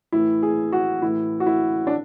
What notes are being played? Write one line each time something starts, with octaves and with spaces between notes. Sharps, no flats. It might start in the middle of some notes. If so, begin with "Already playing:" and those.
A2 E3 E4
G#4
F#4
A2 E3 E4
F#4
E4
D4